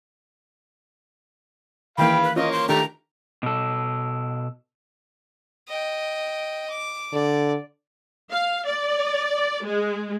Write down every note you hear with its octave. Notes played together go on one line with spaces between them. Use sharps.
D#3 E3 A#3 F5 G5 B5
B4
A#3 C#4 F4 C#5 D#5
C6
D#3 A3 D4 G4 A#5
B2 A4
D#5 G5
D6
D3 D5
F5
D5
G#3